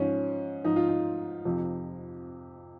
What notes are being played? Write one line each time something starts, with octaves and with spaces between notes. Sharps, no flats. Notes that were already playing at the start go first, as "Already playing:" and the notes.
Already playing: G#2 F3 C#4
G#2 F3 D#4
F4
D#4
F2 C3 F3